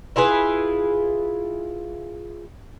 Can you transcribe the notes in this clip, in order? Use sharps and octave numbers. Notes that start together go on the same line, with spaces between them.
E4 F4 G#4 B4